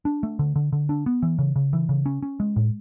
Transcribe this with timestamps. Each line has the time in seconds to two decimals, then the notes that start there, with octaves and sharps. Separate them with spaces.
0.05 D4
0.23 A3
0.39 D3
0.56 D3
0.73 D3
0.89 D4
1.06 B3
1.23 E3
1.39 C#3
1.56 C#3
1.73 E3
1.89 C#3
2.06 C#4
2.23 C#4
2.40 G#3
2.56 A2